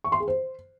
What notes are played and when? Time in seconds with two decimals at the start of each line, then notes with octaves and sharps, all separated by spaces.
0.04 C#6
0.12 C6
0.20 G#4
0.28 C5